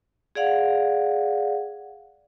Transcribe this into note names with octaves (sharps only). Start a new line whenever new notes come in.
G#4 D5 F5 F#5